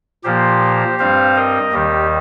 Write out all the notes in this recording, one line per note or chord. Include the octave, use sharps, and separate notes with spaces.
A#2 F3 A#3 G4 C5
G2 G3 C4 C5 F5
A#4 D#5
D#2 D#3 G3 G4